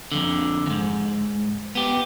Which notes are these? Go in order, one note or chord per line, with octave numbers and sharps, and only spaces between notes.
F2 D3
F2 G#2
B3 G4